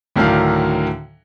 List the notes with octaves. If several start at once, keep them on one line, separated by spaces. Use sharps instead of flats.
D2 A2 D#3 F#3 D4 F5